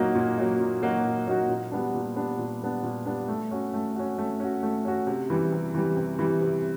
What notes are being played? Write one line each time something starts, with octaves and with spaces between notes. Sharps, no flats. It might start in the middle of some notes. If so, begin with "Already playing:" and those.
Already playing: A#2 F#3 A#3 D#4 F#4
A#2
F#3 A#3 D#4 F#4
A#2
F#3 A#3 D#4 F#4
A#2
F#3 A#3 D#4 F#4
A#2
G3 B3 D4
A#2
G3 B3 D4
A#2
G3 B3 D4
A#2
G3 B3 D4
A3
C#4 F#4
A3
C#4 F#4
A3
C#4 F#4
A3
C#4 F#4
C3
E3 G3
C3
E3 G3
C3
E3 G3
C3